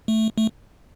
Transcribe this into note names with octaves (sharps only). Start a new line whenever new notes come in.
A3
A3